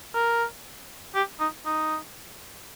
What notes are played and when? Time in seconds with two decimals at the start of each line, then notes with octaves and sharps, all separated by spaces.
0.14 A#4
1.15 G4
1.40 D#4
1.66 D#4